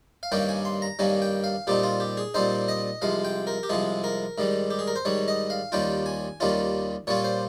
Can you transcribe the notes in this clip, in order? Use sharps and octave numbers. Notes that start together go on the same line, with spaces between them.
F5
G2 D#3 G3 A#3 C#4 G5
G#5
C6
A#5
G2 D#3 G3 A#3 C#4 G#5
G5
F5
A#2 G3 C4 D#4 G4
F4
G4
G#4
A#2 G3 C4 D#4 C5
D#5
C2 C3 F3 G#3 F5
G5
A#4
G4
C2 C3 F3 G#3 G#4
A#4
G#2 D#3 G3
G4
G#4
A#4
C5
G#2 D#3 G3 C#5
D#5
F5
D#2 D#3 G3 C#4 F4 G5
G#5
D#2 D#3 G3 C#4 F4
A#2 G3 C#4 F4 C#5
C5